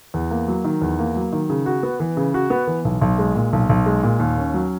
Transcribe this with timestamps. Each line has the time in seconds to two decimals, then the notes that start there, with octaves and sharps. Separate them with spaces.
0.14 E2
0.31 A#3
0.48 F#3
0.64 D#3
0.82 E2
0.99 A#3
1.16 F#3
1.33 D#3
1.50 C#3
1.66 F#4
1.83 B3
2.00 E3
2.17 C#3
2.34 F#4
2.50 B3
2.67 E3
2.85 B1
3.01 B1
3.19 G#3
3.35 A#2
3.53 B1
3.69 B1
3.86 G#3
4.03 A#2
4.19 D#2
4.37 C#4
4.54 F#3